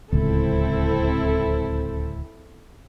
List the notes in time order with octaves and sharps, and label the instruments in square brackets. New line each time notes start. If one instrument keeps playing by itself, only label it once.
[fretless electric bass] D1 C#2 [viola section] C4 E4 A4